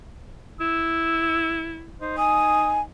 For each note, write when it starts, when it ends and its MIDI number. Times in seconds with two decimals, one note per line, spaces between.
0.60 1.94 64
0.60 1.63 88
2.01 2.88 63
2.01 2.15 72
2.18 2.81 80
2.18 2.69 87